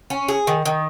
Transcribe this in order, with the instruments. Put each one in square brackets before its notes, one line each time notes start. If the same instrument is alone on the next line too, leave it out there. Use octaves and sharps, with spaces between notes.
[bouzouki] C#4
G#4
D#3
D#3